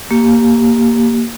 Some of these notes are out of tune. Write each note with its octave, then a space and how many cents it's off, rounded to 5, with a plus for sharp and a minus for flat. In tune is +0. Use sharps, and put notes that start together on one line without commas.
A#3 +0 G4 +0